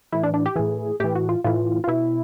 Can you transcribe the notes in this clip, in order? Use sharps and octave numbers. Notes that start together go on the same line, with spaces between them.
A2 E3 E4
D4
D4
G4
A2 E3 G#4
A2 E3 G4
F#4
F4
A2 E3 F4
F4
B2 E4